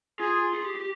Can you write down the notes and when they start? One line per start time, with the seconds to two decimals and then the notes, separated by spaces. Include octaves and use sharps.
0.19 F4 G#4
0.53 G#4
0.64 G4
0.75 G4